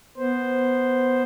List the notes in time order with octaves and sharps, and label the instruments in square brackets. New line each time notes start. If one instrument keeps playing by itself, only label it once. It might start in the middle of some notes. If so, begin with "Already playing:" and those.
[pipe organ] B3 C5